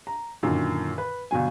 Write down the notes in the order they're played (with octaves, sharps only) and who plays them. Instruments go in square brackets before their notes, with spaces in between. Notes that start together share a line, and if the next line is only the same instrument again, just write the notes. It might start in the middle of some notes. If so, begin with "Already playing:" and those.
[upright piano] A#5
F#2 A#2 D3 D#3
B4
G1 B2 F#3 G#5